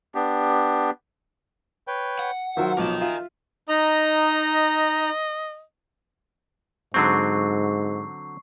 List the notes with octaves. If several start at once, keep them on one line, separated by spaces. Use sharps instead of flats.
B3 D4 G4
B4 C#5 G5
F#5
D#3 F#3 F4 C5 E5
B1 F3 A#4 C#5 D#5 D6
F4 E5 G#5 A#5
D#4 D#5 A#5
G#2 D3 F#3 C4 C#6 C7